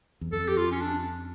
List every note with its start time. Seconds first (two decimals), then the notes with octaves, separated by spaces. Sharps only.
0.21 E2
0.32 F2 A4
0.48 G4
0.57 F4
0.72 C#4
0.81 D4